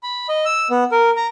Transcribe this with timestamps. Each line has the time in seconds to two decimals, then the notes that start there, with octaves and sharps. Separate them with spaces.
0.03 B5
0.29 D#5
0.45 E6
0.70 B3
0.92 A#4
1.16 A#5